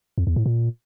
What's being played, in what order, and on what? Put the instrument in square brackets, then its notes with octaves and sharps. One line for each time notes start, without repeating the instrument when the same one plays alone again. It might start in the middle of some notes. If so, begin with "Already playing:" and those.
[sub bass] F2
E2
A2
A#2